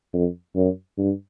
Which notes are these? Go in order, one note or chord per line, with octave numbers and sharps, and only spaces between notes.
F2
F#2
G2